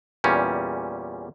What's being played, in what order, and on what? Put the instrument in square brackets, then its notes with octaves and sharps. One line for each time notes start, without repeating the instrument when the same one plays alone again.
[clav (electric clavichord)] E2 A#2 G3 C#4